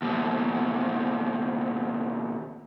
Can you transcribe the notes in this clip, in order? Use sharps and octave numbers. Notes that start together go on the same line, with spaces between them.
D#2 B2